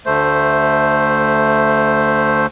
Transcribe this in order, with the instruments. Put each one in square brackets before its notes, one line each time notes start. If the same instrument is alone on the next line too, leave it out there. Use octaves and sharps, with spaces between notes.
[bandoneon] D2 A3 C5